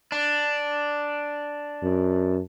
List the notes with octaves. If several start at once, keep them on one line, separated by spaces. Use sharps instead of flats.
D4
F#2